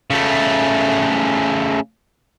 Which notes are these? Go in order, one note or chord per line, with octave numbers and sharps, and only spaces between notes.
C#3 A3